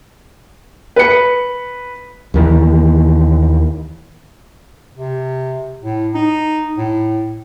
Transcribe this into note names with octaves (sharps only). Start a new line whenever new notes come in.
B4 C#7
D#2 D#3 E3
C3
A2
D#4
A2